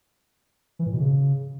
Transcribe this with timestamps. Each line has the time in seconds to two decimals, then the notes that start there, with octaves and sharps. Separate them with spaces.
0.79 E3
0.86 A2
0.93 B2
1.00 C#3